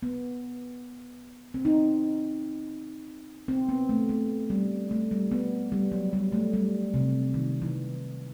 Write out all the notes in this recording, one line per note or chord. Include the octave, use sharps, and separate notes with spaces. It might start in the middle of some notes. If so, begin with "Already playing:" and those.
B3
C4
D#4
C4
B3
A3
A3
G3
A3
G3
B3
G3
F#3
G3
A3
G3
C3
D#3
E3